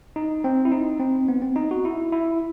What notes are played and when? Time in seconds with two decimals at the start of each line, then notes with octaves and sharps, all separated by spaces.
0.16 D#4
0.44 C4
0.65 E4
0.72 D#4
1.00 C4
1.28 B3
1.42 C4
1.56 D#4
1.71 F#4
1.85 E4
2.12 E4